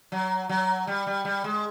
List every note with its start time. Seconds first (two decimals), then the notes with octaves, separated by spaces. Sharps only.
0.12 F#3
0.49 F#3
0.87 G3
1.07 G3
1.25 G3
1.44 G#3